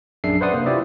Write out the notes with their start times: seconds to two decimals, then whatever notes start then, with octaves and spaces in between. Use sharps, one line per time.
0.24 A#1 F#2 D4 G#4 E5 C7
0.41 B4 C5 D5 F#5 C6 D#6
0.53 C3 A#3
0.66 E4 F4 G4 C5 D5 E5